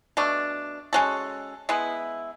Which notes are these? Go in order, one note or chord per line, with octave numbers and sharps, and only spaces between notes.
B2 A3 D4
G#3 C#4 F#4 A4
G#3 B3 E4